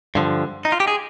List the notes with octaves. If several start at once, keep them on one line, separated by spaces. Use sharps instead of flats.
G2 D3 F3
D#4
F4
G4
G#4